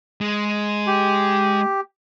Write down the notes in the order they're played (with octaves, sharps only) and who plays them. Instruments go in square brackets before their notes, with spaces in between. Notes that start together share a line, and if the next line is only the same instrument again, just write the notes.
[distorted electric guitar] G#3
[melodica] G4